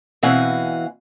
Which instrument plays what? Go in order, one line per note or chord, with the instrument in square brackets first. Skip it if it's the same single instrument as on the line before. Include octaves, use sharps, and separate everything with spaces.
[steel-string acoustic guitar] B2 E3 C4 F5 F#5 G#5